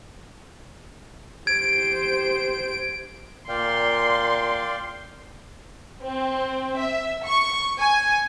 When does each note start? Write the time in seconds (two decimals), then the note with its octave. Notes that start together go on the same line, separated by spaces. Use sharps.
1.47 G4 C5 G#6 D7
3.49 A#2 D5 F5 G5 C6
6.02 C4
6.79 E5
7.24 C#6
7.79 G#5